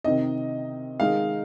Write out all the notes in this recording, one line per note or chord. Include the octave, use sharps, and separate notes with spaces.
C3 D#3 C4 D#4 D#5
D#3 G#3 D#4 F5